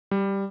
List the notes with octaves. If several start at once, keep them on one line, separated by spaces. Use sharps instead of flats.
G3